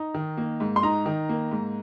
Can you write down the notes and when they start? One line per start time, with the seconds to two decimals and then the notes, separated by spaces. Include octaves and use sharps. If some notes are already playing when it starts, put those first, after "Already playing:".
Already playing: D#4 A#5
0.14 D#3
0.37 A#3
0.60 G#2
0.76 C6
0.83 D#4 A#5
1.06 D#3
1.29 A#3
1.51 G#2